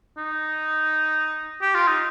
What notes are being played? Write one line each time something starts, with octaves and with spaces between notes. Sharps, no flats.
D#4
G4
F4
D#4